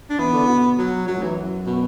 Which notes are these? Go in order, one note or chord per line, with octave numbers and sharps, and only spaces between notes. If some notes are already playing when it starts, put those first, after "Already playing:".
D4
E3 B3
D3
B2
F#3
F#2 F#3
A2
F#2 E3
B2